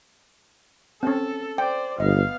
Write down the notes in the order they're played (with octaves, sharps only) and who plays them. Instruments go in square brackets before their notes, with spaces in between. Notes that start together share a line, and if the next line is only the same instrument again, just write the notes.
[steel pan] C4 C#4 [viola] A4
[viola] C5 D5 [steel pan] G5
[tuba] G1 [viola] B3 F5 [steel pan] D#5